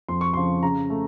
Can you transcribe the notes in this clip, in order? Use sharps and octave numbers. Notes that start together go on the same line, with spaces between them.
F2 C6
C#6
C#3 F3 C6
C#3 A#5
A3